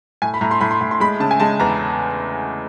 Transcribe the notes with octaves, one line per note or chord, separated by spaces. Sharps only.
A2 G#5
B5
A2 A#5
C6
A2 B5
C6
A2
C6
G#3 B5
C#3 A5
G#5
G#3 A5
E2 A#5